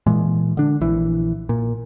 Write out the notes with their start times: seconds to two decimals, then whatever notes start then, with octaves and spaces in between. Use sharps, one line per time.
0.06 A#2 E3 G#3
0.57 D3 D4
0.81 A#1 E3
1.49 A#2